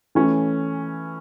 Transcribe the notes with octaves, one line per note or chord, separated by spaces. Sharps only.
E3 A3 C#4